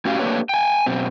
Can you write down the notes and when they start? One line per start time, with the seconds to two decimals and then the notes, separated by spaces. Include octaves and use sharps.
0.05 A2 C#4 F#4 G4 F5
0.19 A3 A#3 D4 G4 B4 C#5
0.49 G5 G#5
0.86 F#2 B2 C4